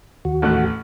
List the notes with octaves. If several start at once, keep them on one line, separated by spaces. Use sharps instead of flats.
D#2 F#4
A1 A3 F#6